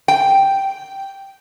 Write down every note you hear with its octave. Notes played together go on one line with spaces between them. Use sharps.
G5